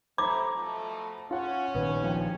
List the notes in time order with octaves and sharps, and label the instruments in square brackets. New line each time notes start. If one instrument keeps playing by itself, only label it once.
[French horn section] C3 A3 [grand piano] C5 A#5 B5 [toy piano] D6
[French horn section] B2 F3 A3
[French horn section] C#4 [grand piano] F4 F#5
[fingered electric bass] A#1 A#2 D#3 [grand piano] B3
[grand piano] F3 G5